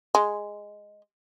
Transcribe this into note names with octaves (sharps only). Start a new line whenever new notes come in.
G#3